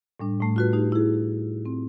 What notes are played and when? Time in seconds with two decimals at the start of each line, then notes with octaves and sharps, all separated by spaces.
0.20 A2 G3 D4
0.40 A2 A3
0.56 F4 F#4 B4
0.73 A3 D#4 G4
0.92 E4 G#4
1.65 C4